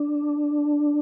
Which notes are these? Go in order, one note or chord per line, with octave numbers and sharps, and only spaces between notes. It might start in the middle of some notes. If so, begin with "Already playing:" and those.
Already playing: D4